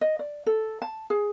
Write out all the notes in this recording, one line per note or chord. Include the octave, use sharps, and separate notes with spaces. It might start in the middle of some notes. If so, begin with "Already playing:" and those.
D#5
D5
A4
A5
G#4